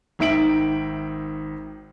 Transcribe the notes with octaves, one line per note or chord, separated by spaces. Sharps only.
G#1 D#3 E5 D7 F#7